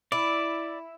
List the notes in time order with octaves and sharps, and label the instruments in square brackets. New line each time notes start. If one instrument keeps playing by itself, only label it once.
[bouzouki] E4 [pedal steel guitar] D5